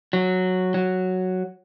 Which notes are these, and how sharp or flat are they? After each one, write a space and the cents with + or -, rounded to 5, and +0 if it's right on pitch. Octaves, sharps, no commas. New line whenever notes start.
F#3 -5
F#3 +0